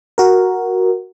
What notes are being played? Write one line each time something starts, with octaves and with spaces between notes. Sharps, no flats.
F#4 A#4